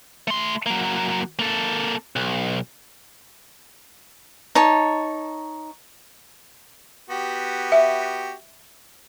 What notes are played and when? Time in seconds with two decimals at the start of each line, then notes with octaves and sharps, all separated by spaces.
0.28 A3 C6
0.66 F#3 A#3
1.39 A#3 A4
2.16 B1
4.55 D#4 C#5 A5
7.10 B3 F#4 G4
7.72 E5